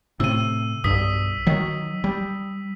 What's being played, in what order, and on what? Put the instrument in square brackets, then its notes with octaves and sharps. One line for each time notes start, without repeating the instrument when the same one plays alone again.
[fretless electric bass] A2 C3 [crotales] E6 D#7
[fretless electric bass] B1 G2 [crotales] D#6 B6
[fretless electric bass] D#3 F#3
G3